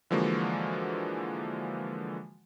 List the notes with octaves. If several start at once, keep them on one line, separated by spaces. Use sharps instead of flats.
D3 E3 F3 G#3 A#3 F#4